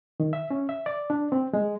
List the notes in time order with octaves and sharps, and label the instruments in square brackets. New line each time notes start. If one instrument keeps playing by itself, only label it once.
[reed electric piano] D#3
E5
C#4
E5
D5
D4
C4
G#3